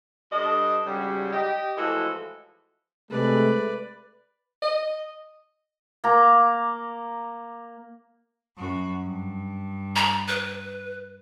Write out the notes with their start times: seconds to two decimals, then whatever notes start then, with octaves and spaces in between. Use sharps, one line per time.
0.32 G2 D4 A4 D#5
0.86 G#2 C#3 F#3 G3
1.33 G4 D#5
1.78 A2 E3 F3 G#3 F#4 A4
3.10 C3 G#3 A3 B4 D5
4.62 D#5
6.04 A#3 A#5
8.57 F#2 F#4
9.01 G2
9.96 A#5
10.28 B4